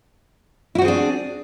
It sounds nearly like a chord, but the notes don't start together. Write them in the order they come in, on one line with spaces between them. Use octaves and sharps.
E4 F#4 C4 G#4 D4